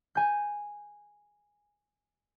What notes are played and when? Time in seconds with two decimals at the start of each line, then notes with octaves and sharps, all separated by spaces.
0.15 G#5 G6